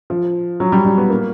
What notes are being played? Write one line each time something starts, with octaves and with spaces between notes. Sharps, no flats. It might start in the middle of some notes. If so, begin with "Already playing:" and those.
F3
F#3
G3
G3
B3
A#3